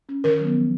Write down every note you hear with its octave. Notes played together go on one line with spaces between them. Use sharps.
C#4
D#3 A#4
F#3 B3
F3